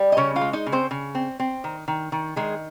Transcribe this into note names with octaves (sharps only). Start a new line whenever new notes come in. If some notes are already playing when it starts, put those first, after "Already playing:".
Already playing: G3
D#5
C#3 C#4 C#5
F4 F5
G#3
D#4 D#5
C#3
C4 C5
C#3
C4
C4
D#3
D#3
D#3
D#3 G#3 G#4